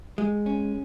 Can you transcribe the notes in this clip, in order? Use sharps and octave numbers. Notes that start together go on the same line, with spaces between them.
G#3
C#4